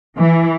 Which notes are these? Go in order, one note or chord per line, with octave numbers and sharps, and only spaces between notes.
E3